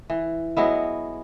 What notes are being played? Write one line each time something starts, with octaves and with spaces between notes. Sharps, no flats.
E3
F#3 G#3 B3 E4